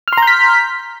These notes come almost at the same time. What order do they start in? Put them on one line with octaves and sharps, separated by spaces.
F6 C6 A#5 G6 B6